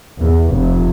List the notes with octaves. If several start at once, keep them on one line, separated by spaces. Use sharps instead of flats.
E2
F1